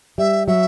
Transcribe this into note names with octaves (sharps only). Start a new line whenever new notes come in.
G3 E5
F#3 E5